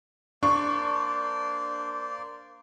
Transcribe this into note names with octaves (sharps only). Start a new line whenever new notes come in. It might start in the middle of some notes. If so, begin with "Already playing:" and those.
A#3 D4 C5 D5 C#6